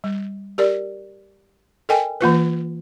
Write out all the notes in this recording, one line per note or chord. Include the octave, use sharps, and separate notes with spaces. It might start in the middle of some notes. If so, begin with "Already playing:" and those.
G3
G4 A#4 D5
A4 A#4 D#5 G5 G#5
E3 A#3 F4 B4